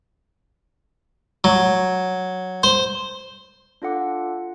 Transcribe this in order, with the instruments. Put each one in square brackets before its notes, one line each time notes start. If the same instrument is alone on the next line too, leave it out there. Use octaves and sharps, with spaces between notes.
[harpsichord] F#3
C5
[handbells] D4 F4 A4 F#5 D6